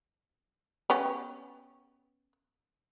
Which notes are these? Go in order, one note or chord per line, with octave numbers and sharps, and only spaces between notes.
B3 C#4 G4